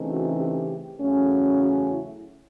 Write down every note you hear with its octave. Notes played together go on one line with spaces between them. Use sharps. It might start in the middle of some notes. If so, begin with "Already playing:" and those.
Already playing: C#3 E3 A3 C4 D#4
F#4
G4
E2 C#3 F#3 A3 C#4
F#4
E4